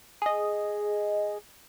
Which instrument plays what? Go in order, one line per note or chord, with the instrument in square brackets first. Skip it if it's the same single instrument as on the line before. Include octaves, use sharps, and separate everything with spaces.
[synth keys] G#4 D#5